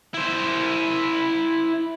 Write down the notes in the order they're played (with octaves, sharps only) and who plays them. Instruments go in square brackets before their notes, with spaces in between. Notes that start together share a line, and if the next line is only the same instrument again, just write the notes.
[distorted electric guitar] E4 C5